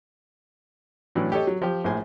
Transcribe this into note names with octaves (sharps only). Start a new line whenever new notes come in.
A2 E3 F#3 C#4 D4
G4 A4 C#5 D#5
F#3
F3 G4
A#1 A2 C5 G#5